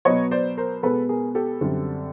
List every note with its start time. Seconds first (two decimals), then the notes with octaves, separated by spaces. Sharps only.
0.05 B2 F#3 B3 C#5 D#5
0.31 C5 D5
0.57 A#4 C5
0.83 B2 G#3 B3 A4 B4
1.09 G#4 A#4
1.35 G4 A4
1.61 F#2 D3 G3 C4